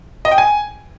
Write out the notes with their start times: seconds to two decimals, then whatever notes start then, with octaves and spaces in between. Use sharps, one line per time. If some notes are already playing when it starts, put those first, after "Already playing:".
0.25 D#5
0.31 G5
0.38 G#5